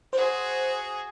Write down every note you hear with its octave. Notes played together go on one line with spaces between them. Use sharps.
F#4 G#4 C5